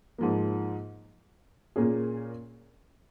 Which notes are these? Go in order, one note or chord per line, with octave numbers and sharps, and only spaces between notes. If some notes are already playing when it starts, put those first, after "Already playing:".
G#2 F3 A#3
A#2 A#3 C#4 G#4